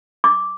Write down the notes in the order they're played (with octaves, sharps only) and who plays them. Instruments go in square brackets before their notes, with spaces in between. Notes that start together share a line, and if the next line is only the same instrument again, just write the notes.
[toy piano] D6